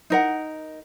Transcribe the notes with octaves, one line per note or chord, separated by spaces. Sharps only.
D#4 A#4 F#5